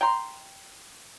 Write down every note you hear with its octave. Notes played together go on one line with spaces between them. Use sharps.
G5 A#5 C6